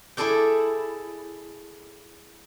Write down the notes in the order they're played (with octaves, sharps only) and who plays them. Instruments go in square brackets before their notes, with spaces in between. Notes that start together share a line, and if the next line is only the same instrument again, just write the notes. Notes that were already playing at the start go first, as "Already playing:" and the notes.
[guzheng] E4 G#4 A4 D5 G5